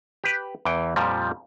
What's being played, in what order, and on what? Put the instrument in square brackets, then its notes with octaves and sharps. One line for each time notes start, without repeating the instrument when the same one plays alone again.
[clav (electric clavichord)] G4 B4
E2 E3 G5
F2 A#2 F3 G3